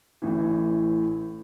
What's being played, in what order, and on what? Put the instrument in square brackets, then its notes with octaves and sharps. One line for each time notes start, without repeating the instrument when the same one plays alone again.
[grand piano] A1 A2 E3